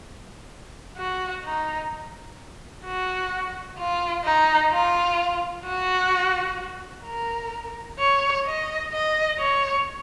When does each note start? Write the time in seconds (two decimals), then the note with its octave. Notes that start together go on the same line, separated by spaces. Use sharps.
0.97 F#4
1.44 D#4
2.85 F#4
3.78 F4
4.24 D#4
4.72 F4
5.65 F#4
7.05 A#4
7.99 C#5
8.46 D#5
8.92 D#5
9.39 C#5